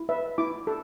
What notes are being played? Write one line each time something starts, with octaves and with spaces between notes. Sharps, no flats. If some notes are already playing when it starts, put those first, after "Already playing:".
Already playing: E4
B4 E5
E4 D6
A4